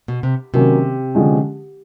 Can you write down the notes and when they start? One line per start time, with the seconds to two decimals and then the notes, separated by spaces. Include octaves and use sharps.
0.08 B2
0.23 C3
0.54 C3 D#3 F#3 A#3 C#4
1.15 D3 F3 G#3 C#4